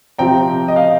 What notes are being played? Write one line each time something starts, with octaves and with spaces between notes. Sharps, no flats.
C3 F3 C4 G5 A#5
D#5
F5